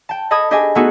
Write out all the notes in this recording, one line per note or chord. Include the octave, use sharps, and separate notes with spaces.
G5 A5
A4 D#5 A5 B5 D#6 G#6
D4 G4 G#4 D#5 E5 G#5
A3 B3 D#4 F#4 G#4 A4